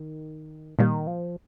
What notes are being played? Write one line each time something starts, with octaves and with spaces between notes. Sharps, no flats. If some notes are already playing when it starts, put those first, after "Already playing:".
Already playing: D#3
A#2 D#3 G3 A#3
F3